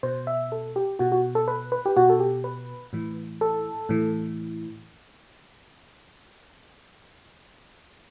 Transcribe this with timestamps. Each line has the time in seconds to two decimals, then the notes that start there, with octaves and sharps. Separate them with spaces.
0.03 B2 C5
0.27 E5
0.52 A4
0.76 G4
0.99 B2 F#4
1.12 F#4
1.35 A4
1.48 B4
1.72 B4
1.86 G4
1.96 B2 F#4
2.09 A4
2.20 G4
2.44 B4
2.93 A2 E3
3.41 A4
3.89 A2 E3